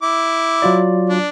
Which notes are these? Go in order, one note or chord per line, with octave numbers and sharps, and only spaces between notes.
E4 D6
F#3 F4 D5
D4